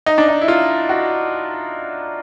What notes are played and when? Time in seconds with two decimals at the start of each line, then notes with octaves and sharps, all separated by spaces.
0.06 D#4
0.18 D4
0.28 D#4
0.41 E4
0.48 F4
0.89 F#4